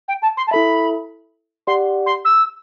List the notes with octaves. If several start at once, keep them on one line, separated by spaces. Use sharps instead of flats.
G5
A5
C6
A5
E4 A4 E5 B5
G4 D5 F#5 C6
C6
E6